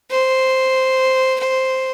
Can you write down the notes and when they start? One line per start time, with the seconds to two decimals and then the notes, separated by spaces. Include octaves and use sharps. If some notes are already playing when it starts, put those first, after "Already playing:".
0.10 C5
1.39 C5